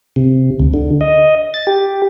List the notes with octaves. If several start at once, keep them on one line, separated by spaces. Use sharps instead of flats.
C3
D2
D3
D#5
A6
G4